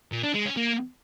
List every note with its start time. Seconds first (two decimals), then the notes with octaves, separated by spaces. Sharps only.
0.12 A#2
0.23 D4
0.35 G#3
0.46 C#4
0.57 A#3